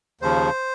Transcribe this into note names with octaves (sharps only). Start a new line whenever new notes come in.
D#2 C#3 F3 C5